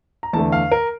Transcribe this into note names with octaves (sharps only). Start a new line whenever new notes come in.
A#5
E2 D3 A3 A5
F5
A#4